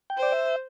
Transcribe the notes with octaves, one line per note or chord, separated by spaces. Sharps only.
G5
C5 D5
E5